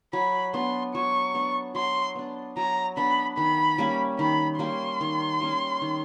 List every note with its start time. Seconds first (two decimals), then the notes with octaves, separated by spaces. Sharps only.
0.13 F#3 B5
0.54 B3 D4 C6
0.94 F#3 C#6
1.35 B3 D4
1.75 F#3 C6
2.15 B3 D4
2.57 F#3 A#5
2.97 B3 D4 B5
3.37 D#3 B5
3.78 G3 A#3 C#4
4.19 D#3 B5
4.59 G3 A#3 C#4 C6
5.01 D#3
5.41 G3 A#3 C#4
5.82 D#3